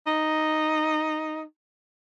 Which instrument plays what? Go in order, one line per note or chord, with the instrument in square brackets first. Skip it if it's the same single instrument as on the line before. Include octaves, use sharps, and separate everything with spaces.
[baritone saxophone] D#4